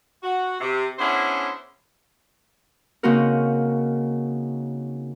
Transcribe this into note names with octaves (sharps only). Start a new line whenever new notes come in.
F#4
C3
B3 C#4 D4 E4 G#4 C5
C#3 A#3 C4 D#4 F#4 A#4